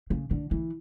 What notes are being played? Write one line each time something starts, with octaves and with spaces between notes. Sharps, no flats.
C#3
D3
E3